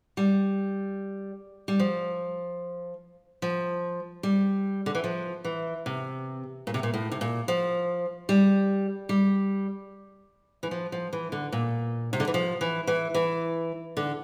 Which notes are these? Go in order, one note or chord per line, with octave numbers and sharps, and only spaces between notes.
G3
G3
F3
F3
G3
D3
E3
F3
E3
C3
A#2
C3
A#2
A2
C3
A#2
F3
G3
G3
E3
F3
F3
E3
D3
A#2
C3
D3
E3
F3
E3
E3
E3
D3